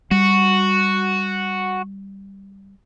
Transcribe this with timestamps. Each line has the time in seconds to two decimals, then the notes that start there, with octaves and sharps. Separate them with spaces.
0.11 G3 F#4